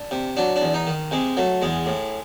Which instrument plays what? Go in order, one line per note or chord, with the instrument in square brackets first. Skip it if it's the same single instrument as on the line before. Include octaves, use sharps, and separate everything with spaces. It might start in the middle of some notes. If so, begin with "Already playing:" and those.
Already playing: [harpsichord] D4
C3
F#3 D4
D4
E2
D#4
D#3
C3 G#3
F#3 A3
E2 G#3
A2